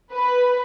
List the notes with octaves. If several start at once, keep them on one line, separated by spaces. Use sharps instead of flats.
B4